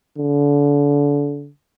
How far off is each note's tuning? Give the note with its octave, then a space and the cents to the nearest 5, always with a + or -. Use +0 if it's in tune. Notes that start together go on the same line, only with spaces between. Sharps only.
D3 -30